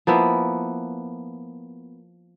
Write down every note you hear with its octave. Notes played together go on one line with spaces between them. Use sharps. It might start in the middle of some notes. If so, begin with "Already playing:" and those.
F3 A#3 B3 E4